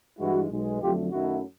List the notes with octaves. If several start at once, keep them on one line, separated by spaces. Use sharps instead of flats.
G2 E3 G#3 E4 F#4
B1 B2 G#3
F2 D3 F#3 A3 F4 G4
F#2 D#3 F#3 A3 E4 F#4